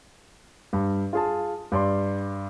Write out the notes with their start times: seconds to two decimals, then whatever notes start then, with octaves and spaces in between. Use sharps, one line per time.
0.73 G2
1.13 F4 G#4 A5
1.72 G2 D5 C6